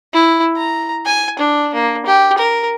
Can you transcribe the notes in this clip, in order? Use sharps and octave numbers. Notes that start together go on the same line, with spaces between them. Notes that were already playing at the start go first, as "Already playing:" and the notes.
E4
A#5
G#5
D4
A#3
G4
A#4